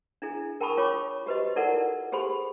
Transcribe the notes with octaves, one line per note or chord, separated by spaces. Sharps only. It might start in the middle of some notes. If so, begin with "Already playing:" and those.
D4 E4 G#4
A#4 G5 A5 B5 C#6 D#6
F4 C#5 C#6 D6
F#4 G4 B4 C5 D#5
D#4 E4 A4 A#4 D5 F#5
G4 G#4 C5 B5 C6